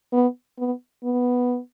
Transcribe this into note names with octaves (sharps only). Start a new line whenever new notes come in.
B3
B3
B3